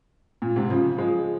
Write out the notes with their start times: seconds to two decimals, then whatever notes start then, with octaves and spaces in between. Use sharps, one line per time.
0.42 A#2
0.56 G#2 C3
0.70 C#3 F3
0.98 F3 G#3